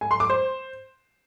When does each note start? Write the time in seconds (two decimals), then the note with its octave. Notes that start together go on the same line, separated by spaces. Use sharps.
0.01 G#5
0.11 C6
0.20 D6
0.30 C5